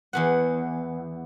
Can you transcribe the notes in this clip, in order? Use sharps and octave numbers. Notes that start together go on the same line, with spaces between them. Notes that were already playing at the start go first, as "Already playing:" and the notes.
E2 B3 F#5